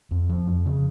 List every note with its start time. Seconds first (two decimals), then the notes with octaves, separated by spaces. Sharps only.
0.11 F2
0.29 F3
0.47 F2
0.66 C#3